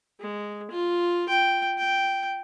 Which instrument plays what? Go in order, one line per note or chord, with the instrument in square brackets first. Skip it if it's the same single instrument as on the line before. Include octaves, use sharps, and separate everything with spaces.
[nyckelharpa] G#3
F4
G5
G5